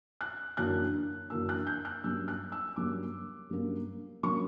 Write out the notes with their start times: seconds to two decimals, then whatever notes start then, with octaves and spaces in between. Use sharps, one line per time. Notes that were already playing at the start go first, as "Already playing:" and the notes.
0.21 F#6
0.57 F#2 E3 A#3 D4 F#6
1.30 F#2 E3 A#3 D4 E6
1.49 F#6
1.67 G6
1.85 F#6
2.04 G2 F#3 A#3 C#4 E6
2.28 F#6
2.52 E6
2.76 G2 F#3 A#3 C#4 D6
3.49 G2 F#3 A#3 C#4
4.23 F#3 A#3 C#4 C#6